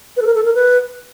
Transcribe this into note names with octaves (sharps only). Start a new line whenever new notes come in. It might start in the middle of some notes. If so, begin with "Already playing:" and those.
B4
A4
A#4
A4
A#4
B4